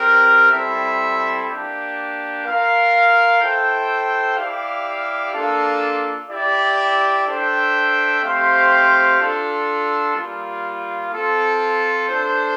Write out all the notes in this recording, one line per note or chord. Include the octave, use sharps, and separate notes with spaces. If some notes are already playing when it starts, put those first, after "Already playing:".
Already playing: C4 G4 A#4
G3 C4 E4 A4 E5
A#3 D4 G4
F4 A#4 F5
E4 A4 C5 G5
E4 G4 D5 F5
A#3 D4 F4 A4
E4 G4 D5
D4 A4 C5 E5 G5
A3 C4 G4 C5 F5
D4 F4 A4
G3 A#3 F4
C4 F4 A4
D4 A4 C5